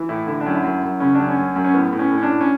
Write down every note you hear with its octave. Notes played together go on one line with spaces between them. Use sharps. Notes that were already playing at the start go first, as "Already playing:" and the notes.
Already playing: E3
A2 E4
D3 E4
D4
F#2
E4
F#2
F#2
C#3 C#4
F#2 D4
C#4
F#2
F#2
C#4
A2 B3
A2
C#4
A2
C#4
D4
A2
C#4